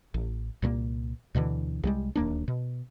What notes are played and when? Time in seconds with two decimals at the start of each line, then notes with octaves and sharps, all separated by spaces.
0.14 A1
0.62 C2 A#2 A3 A#3
1.35 D2 B2 D3 E3
1.84 C2 G3 G#3
2.16 D1 D#2 A#3 D4
2.48 B2